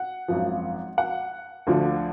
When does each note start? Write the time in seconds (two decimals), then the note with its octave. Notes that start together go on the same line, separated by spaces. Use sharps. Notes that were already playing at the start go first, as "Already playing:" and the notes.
Already playing: F#5
0.28 G#1 F#2 F3
0.98 F#5
1.67 D2 D3 F3